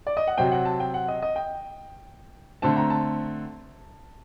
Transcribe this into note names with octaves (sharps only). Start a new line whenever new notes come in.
D5
D#5
F#5
C3 F#3 C4 G5
F#5
A5
G5
F#5
D#5
D#5
G5
D3 A3 C4 A5
A#5
A5